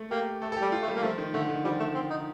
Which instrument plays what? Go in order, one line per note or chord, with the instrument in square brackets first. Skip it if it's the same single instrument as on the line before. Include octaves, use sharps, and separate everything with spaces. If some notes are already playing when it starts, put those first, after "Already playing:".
Already playing: [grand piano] A3
[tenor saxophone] A#3 [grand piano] G4
[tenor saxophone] A3 [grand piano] A4
[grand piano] A4
[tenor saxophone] G3 [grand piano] G4
[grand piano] F4
[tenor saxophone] A3
[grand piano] G3
[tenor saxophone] A#3
[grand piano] F3 [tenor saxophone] A3
[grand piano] D#3
[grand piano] D3 [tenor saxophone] A3
[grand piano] D#3
[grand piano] F3 [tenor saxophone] G3
[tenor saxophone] A3
C4
D#4
[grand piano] D#3